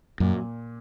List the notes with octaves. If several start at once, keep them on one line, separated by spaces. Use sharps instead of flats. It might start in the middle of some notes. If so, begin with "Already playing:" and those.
F#2 A#2